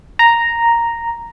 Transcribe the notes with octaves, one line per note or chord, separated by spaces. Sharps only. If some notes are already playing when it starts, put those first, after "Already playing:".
A#5